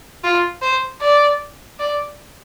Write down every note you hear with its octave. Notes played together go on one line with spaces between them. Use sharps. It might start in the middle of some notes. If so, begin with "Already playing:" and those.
F4
C5
D5
D5